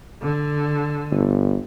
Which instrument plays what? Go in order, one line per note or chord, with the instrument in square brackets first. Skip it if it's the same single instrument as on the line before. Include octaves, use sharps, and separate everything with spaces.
[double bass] D3
[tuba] G1